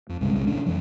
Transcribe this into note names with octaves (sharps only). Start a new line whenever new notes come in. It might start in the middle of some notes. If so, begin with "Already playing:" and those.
F2
C2 G2 C#3 G#3
C2 C3 G#3
A1 C#3 D4
F2 E3 F#3